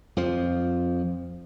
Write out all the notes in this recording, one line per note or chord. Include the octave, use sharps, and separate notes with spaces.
F2 F3